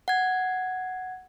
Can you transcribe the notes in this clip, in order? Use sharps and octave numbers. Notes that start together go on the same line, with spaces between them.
F#5 G#6